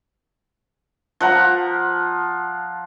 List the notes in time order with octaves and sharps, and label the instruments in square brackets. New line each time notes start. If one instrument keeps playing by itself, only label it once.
[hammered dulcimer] F3 F#5 A#5